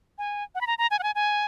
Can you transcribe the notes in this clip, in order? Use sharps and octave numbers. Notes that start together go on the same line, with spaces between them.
G#5
F#5
B5
A#5
A#5
G#5
F#5
G#5
G#5